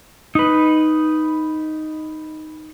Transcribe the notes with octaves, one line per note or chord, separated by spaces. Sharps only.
D#4 B4